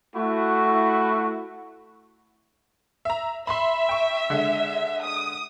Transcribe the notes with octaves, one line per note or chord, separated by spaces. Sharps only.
A3 E4 F#4
E5 A#5
E5 B5 C6
G5 C#6
D3 G#3
D#6